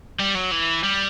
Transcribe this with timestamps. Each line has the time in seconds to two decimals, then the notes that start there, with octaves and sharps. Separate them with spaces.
0.19 G3
0.35 F#3
0.51 E3
0.83 G3